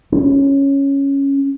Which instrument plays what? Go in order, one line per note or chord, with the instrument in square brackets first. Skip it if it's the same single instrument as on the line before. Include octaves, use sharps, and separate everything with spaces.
[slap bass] C#4